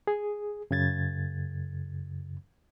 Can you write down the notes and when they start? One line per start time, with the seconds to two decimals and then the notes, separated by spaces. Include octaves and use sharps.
0.07 G#4
0.71 F#2 C#3 G#6 A6